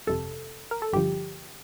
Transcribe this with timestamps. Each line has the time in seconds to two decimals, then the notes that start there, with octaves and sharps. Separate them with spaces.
0.07 G1 F2 C3 A4
0.71 A#4
0.82 A4
0.93 G1 G2 D3 F3 G4